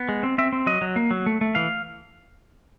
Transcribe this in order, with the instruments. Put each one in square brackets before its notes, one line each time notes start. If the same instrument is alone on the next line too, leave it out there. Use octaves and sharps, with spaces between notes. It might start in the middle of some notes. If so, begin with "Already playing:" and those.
Already playing: [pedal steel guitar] B3
G#3
C4
C4 E5
C4
F#3 D#5
F#3
A#3
F#3
A3
A3
E3 F5